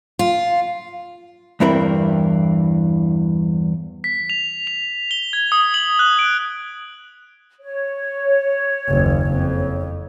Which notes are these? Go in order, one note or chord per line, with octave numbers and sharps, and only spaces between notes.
F4
E2 G2 E3 C4 A#4 B5
B6
F7
F7
G7
G#6
D#6
F#7
F#6
D7
C#5
F#1 D#2
F2